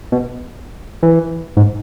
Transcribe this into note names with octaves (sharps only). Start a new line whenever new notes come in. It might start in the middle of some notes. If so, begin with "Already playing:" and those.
B2
E3
G#2